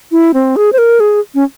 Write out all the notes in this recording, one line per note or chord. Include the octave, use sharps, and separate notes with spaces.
E4
C4
G#4
C5
A#4
G#4
C#4